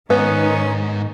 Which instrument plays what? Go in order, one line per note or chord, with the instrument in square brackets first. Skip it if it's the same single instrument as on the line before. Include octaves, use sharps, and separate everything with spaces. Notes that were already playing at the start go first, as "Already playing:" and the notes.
[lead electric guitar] G#2 [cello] D#3 D#4 [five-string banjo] B3 [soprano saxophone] C#4